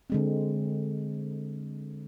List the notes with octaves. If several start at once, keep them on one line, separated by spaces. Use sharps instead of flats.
D3 G#3 C4